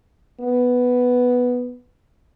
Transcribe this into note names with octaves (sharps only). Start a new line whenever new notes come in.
B3